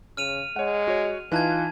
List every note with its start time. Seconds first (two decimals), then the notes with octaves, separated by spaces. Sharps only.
0.17 C#3 F6 D#7 F7
0.56 G#3 C#5 F#5
0.88 F#4 C#5
1.32 E3 D#4 F4 G#5 A5 F#6 G#6